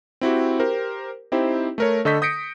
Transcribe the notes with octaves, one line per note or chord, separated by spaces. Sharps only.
C4 E4 F#4 G4
G4 A#4 C5
C4 D#4 E4 G4 C5
A3 A#4 C#5
D3 A4 D#5 C#6 G6 B6
D#6 G6 A#6 B6 C#7 D7